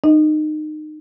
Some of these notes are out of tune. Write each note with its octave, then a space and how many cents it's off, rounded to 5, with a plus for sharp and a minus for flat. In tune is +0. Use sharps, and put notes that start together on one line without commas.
D#4 -25 D#5 +0